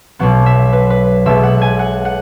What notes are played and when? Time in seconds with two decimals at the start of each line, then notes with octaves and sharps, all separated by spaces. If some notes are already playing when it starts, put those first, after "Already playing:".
0.19 B1 B2 F#3 B3 F#5
0.46 E5
0.73 B4
0.90 B4
1.26 B1 B2 G#3 B3 E5
1.43 F#5
1.62 G#5
1.79 F#5
2.05 F#5